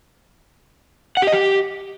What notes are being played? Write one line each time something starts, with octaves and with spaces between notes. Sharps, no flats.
F#5
G4
D#5
G4